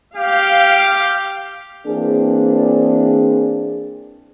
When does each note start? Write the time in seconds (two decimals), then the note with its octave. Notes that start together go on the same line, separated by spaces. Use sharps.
0.16 G4 F5
1.86 E3 A#3 C4 D4 G#4